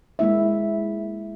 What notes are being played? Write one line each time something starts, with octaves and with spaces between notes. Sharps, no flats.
G#3 A#3 E4 E5